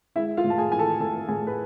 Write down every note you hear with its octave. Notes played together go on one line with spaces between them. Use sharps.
G#3 E4 E5
F4 F5
A2
A5
G#4 G#5
E3 G#5
A4 A5
A2 A4 A5
A2 G#4 G#5
B4